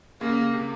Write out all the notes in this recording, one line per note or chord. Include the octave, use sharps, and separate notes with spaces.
C#3 A#3
C3